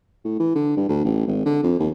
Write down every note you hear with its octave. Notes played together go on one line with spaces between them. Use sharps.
A2
E3
D3
G2
D2
A1
G#1
D3
F2
D#2